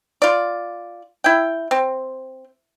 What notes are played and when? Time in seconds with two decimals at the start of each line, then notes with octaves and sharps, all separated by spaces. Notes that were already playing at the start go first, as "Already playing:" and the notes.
0.22 F4 D5
1.24 E4 G5
1.71 C4